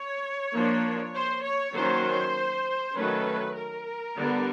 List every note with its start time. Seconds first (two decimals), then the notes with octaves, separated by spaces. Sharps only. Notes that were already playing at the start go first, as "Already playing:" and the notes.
Already playing: C#5
0.54 F3 A#3 D4
1.14 C5
1.43 C#5
1.74 D#3 F#3 A#3 C#4 C5
2.95 D#3 F#3 A3 C#4 B4
3.56 A#4
4.16 D3 G3 B3